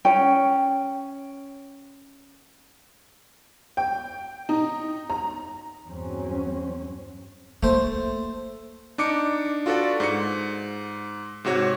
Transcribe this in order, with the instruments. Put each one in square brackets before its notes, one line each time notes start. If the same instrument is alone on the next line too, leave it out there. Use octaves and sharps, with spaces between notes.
[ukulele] C#4 G5
[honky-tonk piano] G5
D#4
A#5
[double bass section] E2 G2 F#3 C4 C#4
[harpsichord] A3 C5 [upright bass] A#3
[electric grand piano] D4 D#4 D6 C#7
F4 F#4 A4 B4 D5
G#2 C#7
G#2 C3 F#4 C#5